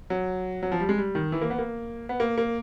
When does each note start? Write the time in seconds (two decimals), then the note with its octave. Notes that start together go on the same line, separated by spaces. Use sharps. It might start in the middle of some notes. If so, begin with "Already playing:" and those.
0.10 F#3
0.63 F#3
0.72 F3
0.80 G3
0.89 G#3
0.98 G3
1.15 D#3
1.32 E3
1.41 A#3
1.50 B3
1.58 A#3
2.09 B3
2.20 A#3
2.38 A#3